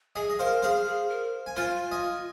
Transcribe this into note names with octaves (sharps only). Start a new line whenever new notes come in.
G#4 D#5 G#5
D#5
A#4 C5 F5
G#4 C5 F5
G#4
A#4
G#5
F4 C5 F5
D#5 G#5